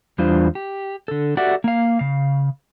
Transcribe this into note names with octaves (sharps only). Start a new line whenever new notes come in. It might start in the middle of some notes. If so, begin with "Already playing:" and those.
E2 G3 D4 F4 C5
G4
D3 A4
F#4 G4 A4 D5 E5 F#5
A#3 F5
C#3 F5